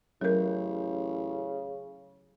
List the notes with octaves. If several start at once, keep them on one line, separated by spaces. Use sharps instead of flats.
A1 C#3 F#3 A#4